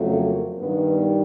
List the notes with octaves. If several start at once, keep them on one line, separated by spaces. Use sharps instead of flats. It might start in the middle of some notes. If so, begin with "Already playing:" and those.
Already playing: F2 C#3 F#3 A3
A#3
G2 D#3 G3 B3